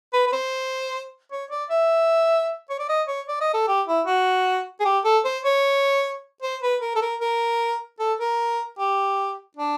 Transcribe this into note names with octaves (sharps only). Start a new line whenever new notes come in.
B4
B4
C5
C#5
D5
E5
C#5
D5
D#5
C#5
D5
D#5
A4
G4
E4
F#4
G#4
G4
A4
C5
C#5
C5
B4
A#4
A4
A#4
A#4
A4
A#4
G4
D4